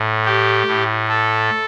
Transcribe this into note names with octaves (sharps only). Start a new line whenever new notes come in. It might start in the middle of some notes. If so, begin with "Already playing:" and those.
Already playing: A2
G4
A2
A4